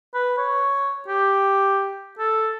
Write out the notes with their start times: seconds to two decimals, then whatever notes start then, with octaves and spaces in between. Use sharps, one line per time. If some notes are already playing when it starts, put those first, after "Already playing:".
0.14 B4
0.38 C#5
1.07 G4
2.19 A4